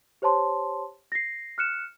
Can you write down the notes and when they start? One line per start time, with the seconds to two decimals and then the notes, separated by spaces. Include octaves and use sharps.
0.22 G4 C5 C#5 A5 C6
1.12 A#6 C7
1.58 F6 F#6 C#7 E7